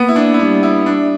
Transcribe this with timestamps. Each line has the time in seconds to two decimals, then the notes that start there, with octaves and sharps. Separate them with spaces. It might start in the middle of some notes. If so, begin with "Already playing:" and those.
Already playing: A#3 B3
0.09 E4
0.16 D4
0.34 E4
0.39 G3 D4
0.63 E4
0.86 D4